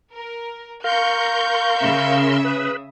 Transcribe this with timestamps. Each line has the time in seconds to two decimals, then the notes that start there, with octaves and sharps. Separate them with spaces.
0.13 A#4
0.84 A#4 F5 A#5 C6 C#6 G6
1.78 C#3 E5
2.45 B4 D#6